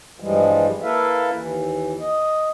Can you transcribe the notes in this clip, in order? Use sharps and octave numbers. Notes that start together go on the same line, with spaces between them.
G2 E3 F3 G3 G#3
A#3 E4 A4 B4 E5 F5
D#2 E3
D#5